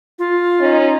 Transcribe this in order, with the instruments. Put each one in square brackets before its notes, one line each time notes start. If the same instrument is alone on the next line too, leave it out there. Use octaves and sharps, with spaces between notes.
[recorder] F4
[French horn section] C#4 D#4